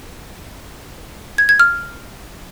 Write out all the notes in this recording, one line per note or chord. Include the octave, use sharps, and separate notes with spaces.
G#6
G#6
F6